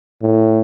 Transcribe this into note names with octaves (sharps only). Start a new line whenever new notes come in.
A2